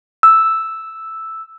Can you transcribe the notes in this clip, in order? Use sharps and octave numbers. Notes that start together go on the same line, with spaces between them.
E6